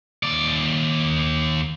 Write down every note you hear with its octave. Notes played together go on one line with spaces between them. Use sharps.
D#2 D5